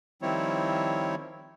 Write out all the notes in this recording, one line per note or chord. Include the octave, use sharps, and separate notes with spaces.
D#3 F3 G3 C4 E4 C#5